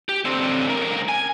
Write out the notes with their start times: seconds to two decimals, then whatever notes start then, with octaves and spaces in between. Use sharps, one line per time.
0.09 G4
0.25 D3 C4
0.69 C#2 A#4
1.09 G#5